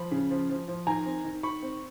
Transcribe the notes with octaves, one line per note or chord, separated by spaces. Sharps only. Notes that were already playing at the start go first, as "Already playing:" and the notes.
Already playing: F3 B5
C#3
F3
F3
F3
D#3 G#5 A#5
C4
D#3
D#3 B5 C#6
C4